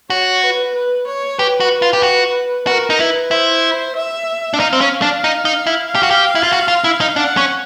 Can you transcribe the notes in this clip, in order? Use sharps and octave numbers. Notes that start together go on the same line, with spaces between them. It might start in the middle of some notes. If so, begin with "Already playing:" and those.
F#4 C#5
B4
B4
C#5
G4 B4
F#4
F4
G4
F#4
F#4 A#4
D#4
E4 B4
E4 C5
E5
D4
D#4 F5
C4
C#4
D4
D#4
D#4
E4
F5
G4
F#4
G4
E4
F4
F#4
F4
E4
D#4
D4 F#5
C#4